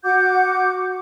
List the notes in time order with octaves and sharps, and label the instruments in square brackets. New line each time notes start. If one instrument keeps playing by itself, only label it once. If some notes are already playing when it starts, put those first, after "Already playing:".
[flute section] F#4 F#5 D6 G6